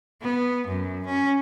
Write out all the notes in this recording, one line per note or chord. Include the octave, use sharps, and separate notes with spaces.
B3
F#2
C#4